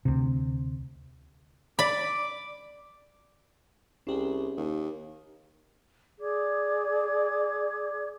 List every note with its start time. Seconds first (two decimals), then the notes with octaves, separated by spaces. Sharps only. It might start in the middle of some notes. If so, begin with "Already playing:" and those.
0.05 D2 C3
1.79 D5 B5 D6
4.07 C2 C#4 G4 G#4
4.57 D#2
6.20 G#4 D5 D6 G#6